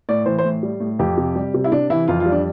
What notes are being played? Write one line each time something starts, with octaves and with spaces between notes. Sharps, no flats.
A2 D5
E3 C5
C5
A2
G3
A2
F2 G4
C3
G3
C3
E4
C3 D4
E3 E4
F2 F4
F4
G3
D4